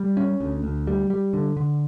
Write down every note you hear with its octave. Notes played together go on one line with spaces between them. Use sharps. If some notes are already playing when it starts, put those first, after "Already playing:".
Already playing: G3
C#4
D2
D2
G3
G3
D3
D3